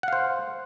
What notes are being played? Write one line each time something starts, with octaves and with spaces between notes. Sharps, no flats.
C5 F5 F#5